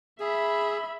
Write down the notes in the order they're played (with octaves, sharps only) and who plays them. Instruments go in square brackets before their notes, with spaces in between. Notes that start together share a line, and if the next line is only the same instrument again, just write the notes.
[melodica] G#4 [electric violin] E5 B5